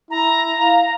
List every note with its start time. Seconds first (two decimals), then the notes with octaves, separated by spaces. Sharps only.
0.11 E4 A#5
0.60 F5